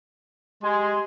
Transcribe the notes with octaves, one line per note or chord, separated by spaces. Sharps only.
G#3 G4 G#5 C6